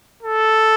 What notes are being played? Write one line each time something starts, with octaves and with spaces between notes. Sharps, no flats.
A4